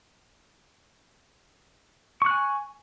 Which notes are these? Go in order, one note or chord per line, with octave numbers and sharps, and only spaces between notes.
G#5 C#6 F#6